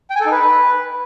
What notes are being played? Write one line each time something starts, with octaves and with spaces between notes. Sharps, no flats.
G5
G#5
A4
D#4
B4